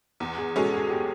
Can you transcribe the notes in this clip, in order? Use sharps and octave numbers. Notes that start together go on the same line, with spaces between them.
E2
G#4
B2 G#3 C#4 A4
G#4
G4